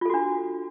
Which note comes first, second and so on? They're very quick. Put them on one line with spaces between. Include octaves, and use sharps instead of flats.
F4 A4 F#4 D4